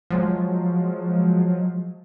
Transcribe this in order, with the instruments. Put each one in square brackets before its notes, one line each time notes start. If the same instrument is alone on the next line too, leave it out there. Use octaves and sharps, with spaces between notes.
[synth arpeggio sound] F3 F#3 G#3